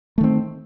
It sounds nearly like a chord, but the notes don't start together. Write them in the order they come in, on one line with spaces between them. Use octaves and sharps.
A3 D#3 C4